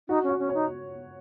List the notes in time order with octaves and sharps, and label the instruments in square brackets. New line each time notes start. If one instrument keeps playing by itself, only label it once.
[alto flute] D#4 [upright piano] F#4
[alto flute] C#4
[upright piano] F#4
[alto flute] C#4
[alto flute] D#4 [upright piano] C#5